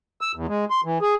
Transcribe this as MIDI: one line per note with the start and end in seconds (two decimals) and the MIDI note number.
0.21 0.32 88
0.35 0.46 40
0.48 0.65 56
0.70 0.81 84
0.85 0.98 52
1.02 1.15 68